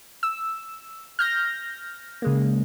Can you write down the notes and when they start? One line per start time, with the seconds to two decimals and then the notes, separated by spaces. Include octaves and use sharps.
0.23 E6
1.19 F6 G6 A#6
2.22 C#3 G#3 A#3